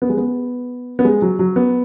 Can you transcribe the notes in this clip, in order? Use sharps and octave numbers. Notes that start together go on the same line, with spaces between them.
B3
G#3
B3
B3
G#3
F#3
F#3
B3